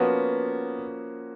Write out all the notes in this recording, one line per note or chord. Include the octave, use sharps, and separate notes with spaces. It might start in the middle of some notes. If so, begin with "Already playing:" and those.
Already playing: F3 A#3 B3 C#4 F#4